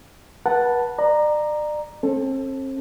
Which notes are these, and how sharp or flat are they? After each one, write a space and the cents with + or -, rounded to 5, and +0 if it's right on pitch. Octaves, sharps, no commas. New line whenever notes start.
B4 -35 F#5 +0 A5 +0
D5 +35 A#5 +0
C4 +40 A4 +0